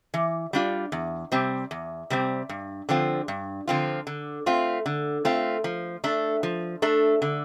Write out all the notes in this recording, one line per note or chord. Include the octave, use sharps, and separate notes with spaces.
E3
G3 D4 F4
E2
C3 G3 C4
E2
C3 G3 C4
G2
D3 F3 C4 F4
G2
D3 F3 C4 F4
D3
A3 C4 F4
D3
A3 C4 F4
F3
A3 D4 A4
F3
A3 D4 A4
D3